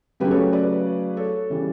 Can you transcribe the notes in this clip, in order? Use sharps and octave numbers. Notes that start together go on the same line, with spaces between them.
C#3 F#3 A3 C#4 G4 B4
A4 C#5
B4 D5
A4 C#5
C#3 E3 G3 C#4